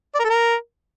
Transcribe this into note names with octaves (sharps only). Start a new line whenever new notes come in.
D5
A#4
A4
A#4